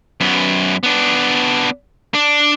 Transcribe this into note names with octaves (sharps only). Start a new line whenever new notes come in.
F#2 B3
B3 D4
D4